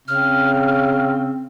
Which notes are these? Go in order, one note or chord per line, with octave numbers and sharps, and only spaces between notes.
C#3 C4 F6